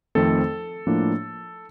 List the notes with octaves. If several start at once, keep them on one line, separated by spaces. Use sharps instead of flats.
F2 D#3 A3 C4 A4
A2 F3 A#3 D4